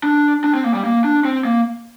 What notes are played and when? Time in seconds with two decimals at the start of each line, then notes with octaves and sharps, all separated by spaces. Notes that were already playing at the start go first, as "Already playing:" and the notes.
0.03 D4
0.44 D4
0.54 C4
0.64 A#3
0.74 G3
0.84 A#3
1.04 D4
1.25 C4
1.45 A#3